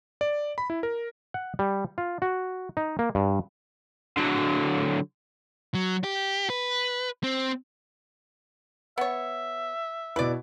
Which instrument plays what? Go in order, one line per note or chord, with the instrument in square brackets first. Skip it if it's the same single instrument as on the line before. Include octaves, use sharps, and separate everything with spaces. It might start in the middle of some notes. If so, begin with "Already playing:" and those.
[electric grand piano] D5
B5
E4
A#4
[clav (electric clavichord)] F#5
G3
F4
F#4
D#4
A#3
G2
[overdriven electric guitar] D3 F#3
[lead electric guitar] F#3
G4
B4
C4
[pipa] B3 C#5 [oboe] E5
[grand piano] B2 E4 [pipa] B4 D5